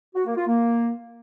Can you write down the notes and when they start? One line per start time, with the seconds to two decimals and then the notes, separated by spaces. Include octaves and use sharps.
0.15 F#4
0.26 A#3
0.37 F4
0.47 A#3